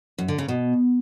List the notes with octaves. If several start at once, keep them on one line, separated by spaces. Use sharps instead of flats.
F#2
D3
C#3
B2